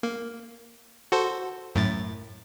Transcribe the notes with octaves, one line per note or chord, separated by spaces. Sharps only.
A#3
F#4 A4 C5
F#2 A2 A6